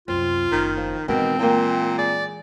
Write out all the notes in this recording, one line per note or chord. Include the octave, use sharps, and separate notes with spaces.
C2 F#2 C4 F4
F#1 D#3
F3
B2 D#3 E3 G#3 C4
A#2 A#3 G5
G#4 D5